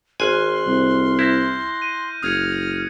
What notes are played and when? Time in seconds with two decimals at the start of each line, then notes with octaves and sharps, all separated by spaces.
0.20 G#1 G#5 C6 F6 F#6 F#7
0.66 C2
1.19 E4 G6 A#6
1.82 D#7
2.22 F#1 D#6 F6 G#6 C#7